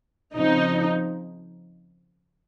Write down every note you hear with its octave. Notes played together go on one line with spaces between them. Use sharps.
C#3 F3 C4 D#4